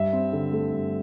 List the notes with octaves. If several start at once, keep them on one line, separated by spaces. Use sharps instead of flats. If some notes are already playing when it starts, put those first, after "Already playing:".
Already playing: G2 E5
C4
D3
A3
G2